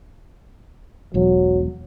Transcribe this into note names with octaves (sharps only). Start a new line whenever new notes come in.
E1 B1 F#3